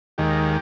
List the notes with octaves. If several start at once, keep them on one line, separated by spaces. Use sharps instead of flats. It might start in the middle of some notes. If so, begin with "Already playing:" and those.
D#2 D#3 G#3 G4